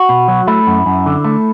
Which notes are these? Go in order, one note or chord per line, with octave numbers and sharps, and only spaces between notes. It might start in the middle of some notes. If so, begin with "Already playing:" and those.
Already playing: F#4
B2
F#3
A3 E4
F#2
F#2
D3
A3